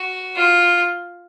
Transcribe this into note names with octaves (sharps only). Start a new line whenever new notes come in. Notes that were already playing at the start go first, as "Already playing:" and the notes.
Already playing: F#4
F4